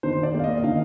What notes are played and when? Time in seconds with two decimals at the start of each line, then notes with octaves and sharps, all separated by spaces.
0.03 D#3 C5
0.23 D5
0.34 A#3
0.39 F5
0.44 D#5
0.57 D#5
0.64 D#3 F5